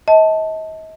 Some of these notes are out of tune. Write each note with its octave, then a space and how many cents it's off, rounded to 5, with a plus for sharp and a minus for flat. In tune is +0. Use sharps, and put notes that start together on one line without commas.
D#5 +40 A5 +0